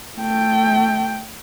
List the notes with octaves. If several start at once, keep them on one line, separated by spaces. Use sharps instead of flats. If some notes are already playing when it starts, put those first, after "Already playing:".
A3 G5